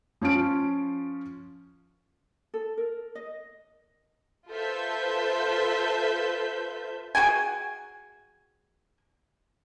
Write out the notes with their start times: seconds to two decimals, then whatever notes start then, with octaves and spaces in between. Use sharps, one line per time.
0.21 F3 C#4 F4 D7
2.54 A4
2.77 A#4
3.15 D#5
4.50 F4 A4 B4 C5 E5 G6
7.15 F#4 G#4 G5 G#5